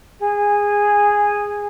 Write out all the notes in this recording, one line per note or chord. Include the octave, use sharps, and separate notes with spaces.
G#4